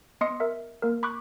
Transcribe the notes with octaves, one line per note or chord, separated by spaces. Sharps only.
B3 D#5 C6 D#6 C#7
A#4 E5
A#3 A#4
B5 C#6 D6 F#6